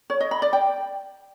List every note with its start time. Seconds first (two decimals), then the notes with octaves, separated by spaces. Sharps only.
0.10 C#5
0.20 D#5
0.31 B5
0.42 D5
0.53 G5